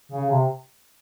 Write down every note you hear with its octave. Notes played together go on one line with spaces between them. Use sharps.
C#3
C3